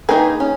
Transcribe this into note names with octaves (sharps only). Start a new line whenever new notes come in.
D#3 A#3 D#4 G#4 B4
C#4